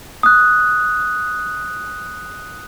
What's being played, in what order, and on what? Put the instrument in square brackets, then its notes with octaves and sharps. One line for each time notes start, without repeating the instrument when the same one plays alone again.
[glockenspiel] D#6 F#6